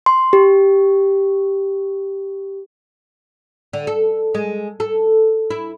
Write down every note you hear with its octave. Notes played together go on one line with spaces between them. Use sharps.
C6
G4
D3
A4
G#3
A4
E4